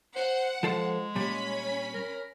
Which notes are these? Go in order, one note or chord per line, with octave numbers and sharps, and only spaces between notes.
C5 F#5
F3 G#3 A4 C5
A#2 G3 C#4 B5
A#4